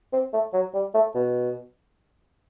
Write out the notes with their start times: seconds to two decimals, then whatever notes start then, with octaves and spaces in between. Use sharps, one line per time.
0.13 C4
0.33 A3
0.54 F#3
0.74 G3
0.94 A3
1.15 B2